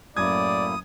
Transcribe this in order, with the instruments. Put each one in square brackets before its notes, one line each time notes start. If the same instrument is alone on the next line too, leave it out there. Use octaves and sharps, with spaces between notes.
[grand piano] F#2 G#6 [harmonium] A2 A#3 E4 [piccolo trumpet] D5 [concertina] D#6